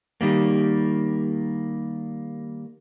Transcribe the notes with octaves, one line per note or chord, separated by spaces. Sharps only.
D#3 G3 A#3